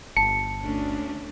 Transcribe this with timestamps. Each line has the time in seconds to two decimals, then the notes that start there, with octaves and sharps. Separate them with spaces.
0.17 G1 A5 C#7
0.63 D2 C#4 D4